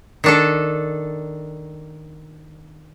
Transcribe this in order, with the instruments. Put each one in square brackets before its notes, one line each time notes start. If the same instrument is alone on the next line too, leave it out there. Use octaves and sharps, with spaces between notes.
[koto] D#3 D4 A4